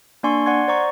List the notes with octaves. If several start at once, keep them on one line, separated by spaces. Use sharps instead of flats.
A#3 D4 D5 G#5 C6 C#6
D5 F#5 C6 G#6
C5 D5 A#5 C#6